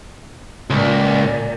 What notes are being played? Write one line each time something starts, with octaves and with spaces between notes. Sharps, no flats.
C#2 A#2